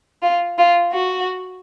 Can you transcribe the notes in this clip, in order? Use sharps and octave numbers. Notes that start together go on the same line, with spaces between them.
F4
F4
F#4